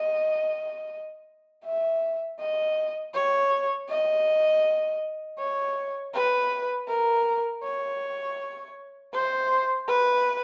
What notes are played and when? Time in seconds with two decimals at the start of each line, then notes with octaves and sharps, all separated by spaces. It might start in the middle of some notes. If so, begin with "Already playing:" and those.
Already playing: D#5
1.65 E5
2.39 D#5
3.15 C#5
3.89 D#5
5.39 C#5
6.14 B4
6.88 A#4
7.63 C#5
9.13 C5
9.88 B4